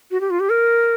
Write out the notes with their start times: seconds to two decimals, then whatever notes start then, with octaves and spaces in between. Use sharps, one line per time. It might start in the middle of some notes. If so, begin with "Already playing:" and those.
0.11 F#4
0.21 G4
0.30 F4
0.40 G4
0.50 A#4